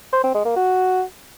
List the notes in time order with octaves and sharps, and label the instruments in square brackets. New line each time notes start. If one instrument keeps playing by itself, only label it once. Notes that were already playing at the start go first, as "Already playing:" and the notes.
[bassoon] C5
C4
G#3
A#3
F#4